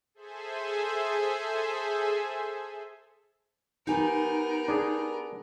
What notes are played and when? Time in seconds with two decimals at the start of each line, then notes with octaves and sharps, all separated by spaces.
0.14 G#4 A4 C5 E5 G#5
3.87 B3 D#4 G4 A#4 G#5
4.68 D4 G#4